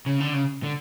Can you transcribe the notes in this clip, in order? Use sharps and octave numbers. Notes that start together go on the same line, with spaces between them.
C#3
D3
C#3
D3